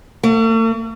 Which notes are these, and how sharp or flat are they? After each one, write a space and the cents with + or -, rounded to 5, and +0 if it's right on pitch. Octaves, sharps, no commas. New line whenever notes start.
A3 +45